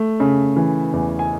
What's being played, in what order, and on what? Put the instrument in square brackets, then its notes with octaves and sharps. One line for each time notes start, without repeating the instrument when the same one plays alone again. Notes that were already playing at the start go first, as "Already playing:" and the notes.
Already playing: [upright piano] A3
C#3
E3
E2
G#5